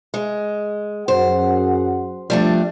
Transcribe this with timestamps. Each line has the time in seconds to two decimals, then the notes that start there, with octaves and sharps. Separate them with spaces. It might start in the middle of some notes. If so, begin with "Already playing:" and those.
0.14 G#3
1.08 F#2 G#4 C5 F#5
2.30 F3 G3 A3 D4